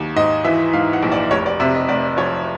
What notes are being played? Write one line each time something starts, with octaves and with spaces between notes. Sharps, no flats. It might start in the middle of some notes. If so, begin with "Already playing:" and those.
Already playing: D#2
G#2 D#5
E3 E5
G#2 F5
F#5
A#1
D5
F1 C#5
D5
C3 E5
D#5
F1 D5
F3 C#5